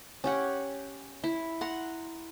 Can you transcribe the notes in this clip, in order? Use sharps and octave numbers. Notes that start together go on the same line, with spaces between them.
C#4 G4 F#5
E4
F#5 A#5 C6